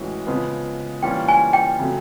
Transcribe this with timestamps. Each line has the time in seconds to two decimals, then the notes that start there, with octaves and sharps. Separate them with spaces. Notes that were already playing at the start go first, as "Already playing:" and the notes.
Already playing: A2 E3 G#3 C#4 F#4
0.27 C#3 F3 G#3 B3
1.02 E3 G3 A#3 C#4 F4 G5
1.28 G#5
1.53 G5
1.79 C#3 F#3 A3